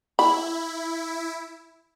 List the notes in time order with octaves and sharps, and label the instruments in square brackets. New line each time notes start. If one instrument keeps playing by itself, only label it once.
[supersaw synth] E4 [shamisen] B5